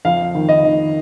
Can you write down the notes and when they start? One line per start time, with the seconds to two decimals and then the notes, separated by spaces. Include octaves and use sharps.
0.05 F2 F5
0.35 D#3
0.49 D#5
0.63 D#3